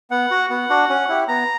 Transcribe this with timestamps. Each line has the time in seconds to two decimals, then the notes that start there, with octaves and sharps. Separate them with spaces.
0.11 B3 F#5
0.31 F#4
0.50 B3 F#5
0.70 D4 F#4
0.89 C#4
1.09 E4 G4
1.28 B3 A#5